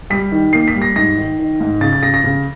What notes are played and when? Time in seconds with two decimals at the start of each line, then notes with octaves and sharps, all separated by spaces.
0.10 G3 B6
0.32 D#3
0.53 A#3 C7
0.68 B6
0.74 G3
0.82 A#6
0.96 G#2 A#6
1.18 D#3
1.39 D#3
1.61 G#2
1.81 C#3 A6
1.93 A6
2.03 C#3 A#6
2.14 A#6
2.24 C#3